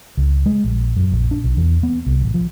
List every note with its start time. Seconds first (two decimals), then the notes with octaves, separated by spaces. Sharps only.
0.17 C#2
0.46 G#3
0.64 A#1
0.96 F#2
1.12 A#1
1.31 D4
1.44 B1
1.57 E2
1.83 B3
2.06 C2
2.22 A1
2.34 F3